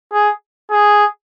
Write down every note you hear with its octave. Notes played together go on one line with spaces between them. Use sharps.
G#4
G#4